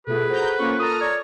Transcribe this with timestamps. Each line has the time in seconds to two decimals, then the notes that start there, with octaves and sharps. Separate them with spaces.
0.07 B2 A3 F4 G#4 A4 B4
0.29 F#4 A4 C5 F#5 A#5 G6
0.58 A#3 C#4 F4 C#6
0.79 F4 A4 A#4 A#5 D#6 F6 A6
1.01 C#5 D5 G#6